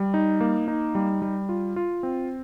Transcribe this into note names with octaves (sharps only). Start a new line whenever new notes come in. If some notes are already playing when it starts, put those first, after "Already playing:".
Already playing: G3
D#4
A#3
D#4
G3
G3
F4
F4
C4